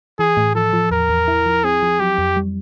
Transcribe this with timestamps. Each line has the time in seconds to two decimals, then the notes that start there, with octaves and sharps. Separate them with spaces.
0.19 E3 G#4
0.37 A2
0.55 F3 A4
0.73 F3
0.91 E2 A#4
1.09 E2
1.28 E4
1.46 F3
1.64 C4 G#4
1.83 F3
2.00 F#3 G4
2.18 F2
2.37 G3